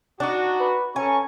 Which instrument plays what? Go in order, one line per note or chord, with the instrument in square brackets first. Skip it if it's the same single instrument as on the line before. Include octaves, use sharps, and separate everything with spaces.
[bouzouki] D4 D#4 [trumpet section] F#4
[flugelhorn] B4
[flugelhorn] C#4 [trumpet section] A4 A#5 C#6 [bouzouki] G#5